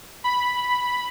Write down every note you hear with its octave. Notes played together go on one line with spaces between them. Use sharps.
B5